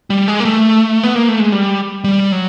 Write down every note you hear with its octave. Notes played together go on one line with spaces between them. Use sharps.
G3
G#3
A#3
A3
B3
A#3
A3
G#3
G3
G3
F#3